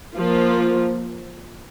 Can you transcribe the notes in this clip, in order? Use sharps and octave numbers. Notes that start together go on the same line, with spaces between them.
F3 A#3 F4